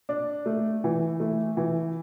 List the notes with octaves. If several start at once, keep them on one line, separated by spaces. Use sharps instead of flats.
D4
A3
E3
A3
E3